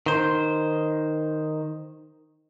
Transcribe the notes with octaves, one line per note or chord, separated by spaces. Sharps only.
D#3 C5